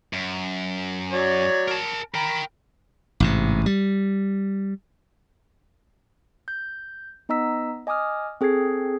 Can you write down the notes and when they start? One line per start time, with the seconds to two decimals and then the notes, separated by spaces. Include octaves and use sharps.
0.13 F#2
1.12 F#3 C#5 D5
1.68 A#4 A5
2.15 A#4 G5 A#5 B5
3.20 A1 G#2 C3
3.66 G3
6.48 G6
7.29 B3 D#4 D#5 A#5 E6 B6
7.87 D#5 G#5 D6 D#6 F6
8.41 C4 G#4 A4 G#6 C7